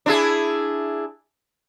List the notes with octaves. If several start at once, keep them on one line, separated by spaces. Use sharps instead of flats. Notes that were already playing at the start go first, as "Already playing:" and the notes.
D4 E4 G#4